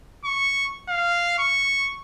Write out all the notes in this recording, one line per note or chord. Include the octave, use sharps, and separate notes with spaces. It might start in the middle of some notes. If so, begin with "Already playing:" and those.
C#6
F5
C#6